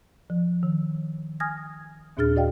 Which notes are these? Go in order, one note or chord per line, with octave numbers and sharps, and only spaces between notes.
F3
D#3
G#5 D#6 F6 G#6 A#6
D#2 A#2 D4 G#4 F6 A6
F#4 D5 D#5 F5 G5